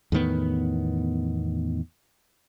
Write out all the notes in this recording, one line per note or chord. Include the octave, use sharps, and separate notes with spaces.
E2 A2 D#3 B3